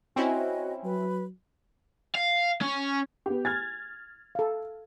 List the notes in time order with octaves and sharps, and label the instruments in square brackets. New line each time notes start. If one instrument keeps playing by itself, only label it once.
[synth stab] C4 C#4 E4 [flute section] F#4 D#5 G#5
[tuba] F#3 [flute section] B4
[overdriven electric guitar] F5
C#4
[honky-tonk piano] B3 G4
[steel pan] G#5 [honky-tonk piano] F6 G#6 A6
[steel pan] A4 F5